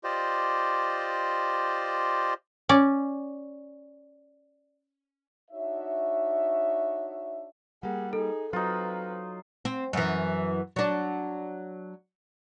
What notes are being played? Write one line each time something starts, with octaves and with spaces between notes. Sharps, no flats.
F4 G4 C5 D5 D#5
C#4 D5
D4 D#4 F#4 C#5 E5
G3 A#3 G#4 F#5
D#4 G#4 A4
F#3 C4 D#4 F4 B4
C4
F#2 E3
F#3 D4